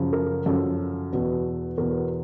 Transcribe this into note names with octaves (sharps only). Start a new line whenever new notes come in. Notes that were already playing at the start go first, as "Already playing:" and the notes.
Already playing: F#2 C#3 F3
A#4
F#2 C#3 F3 A4
E2 B2
E2 B2 A#4